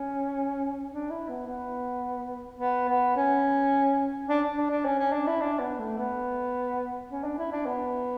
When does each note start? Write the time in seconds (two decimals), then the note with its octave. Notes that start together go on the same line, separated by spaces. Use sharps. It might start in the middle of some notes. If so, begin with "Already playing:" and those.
Already playing: C#4
0.92 D4
1.10 E4
1.29 B3
1.47 B3
2.59 B3
2.89 B3
3.16 C#4
4.28 D4
4.57 D4
4.70 D4
4.85 C#4
4.99 C#4
5.13 D4
5.27 E4
5.41 D4
5.60 B3
5.79 A3
5.98 B3
7.10 C#4
7.24 D4
7.38 E4
7.52 D4
7.66 B3